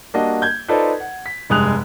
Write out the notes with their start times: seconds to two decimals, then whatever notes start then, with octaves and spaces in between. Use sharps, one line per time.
0.14 G3 A#3 D4 F#4 D#5
0.42 G6 G#6
0.68 D#4 F4 A4 B4 C5 D5
1.00 F#5
1.26 B6
1.50 F1 G2 G#3 D#6 F#6 F7